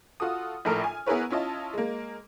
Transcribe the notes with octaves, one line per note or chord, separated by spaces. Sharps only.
F4 F#4 A4 D#6
A#1 A2 A4 A#4 F6
G#5
B3 E4 G#4 A#4 B4 C#5
C#4 E4 F4 D#5 A5
G#3 A#3